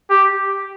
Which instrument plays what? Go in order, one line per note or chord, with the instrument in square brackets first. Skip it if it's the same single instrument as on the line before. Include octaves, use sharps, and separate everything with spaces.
[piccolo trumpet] G4